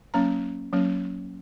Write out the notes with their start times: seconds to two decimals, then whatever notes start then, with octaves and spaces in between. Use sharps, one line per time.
0.14 F#3 A#3 C#4 A#5
0.73 F#3 A#3 C#4